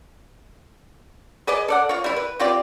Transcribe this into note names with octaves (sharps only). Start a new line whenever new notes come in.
G#4 B4 D5 D#5
A4 D5 F#5
F4 C#5
G3 E4
B4
C4 F4 G4 D5